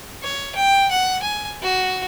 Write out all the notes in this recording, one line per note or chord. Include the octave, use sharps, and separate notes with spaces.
C#5
G5
F#5
G#5
F#4